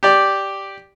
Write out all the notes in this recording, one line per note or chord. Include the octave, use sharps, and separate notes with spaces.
G4 D5